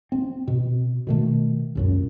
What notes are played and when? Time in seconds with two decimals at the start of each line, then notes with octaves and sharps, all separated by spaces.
0.12 C4
0.48 B2
1.07 B2 D#3 A3
1.75 C#2 F#2 A#2